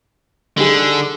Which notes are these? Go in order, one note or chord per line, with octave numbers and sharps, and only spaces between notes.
D3 G3 D#4 G#4